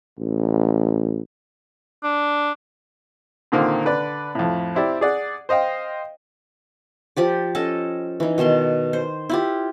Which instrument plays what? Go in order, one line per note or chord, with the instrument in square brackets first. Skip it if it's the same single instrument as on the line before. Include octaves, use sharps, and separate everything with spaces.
[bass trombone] A1
[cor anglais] D4
[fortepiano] A#2 D3 D#3 A#3 C4
D3 B4 D5
F2 A2
C4 E4 G4 D5
G#4 D5 F#5
C5 D#5 F5 G5
[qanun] F3 G4 D5
C#4 A4 D#5 A5
E3 D#4
B2 D#3 A5 C6
C5
E4 F4 G4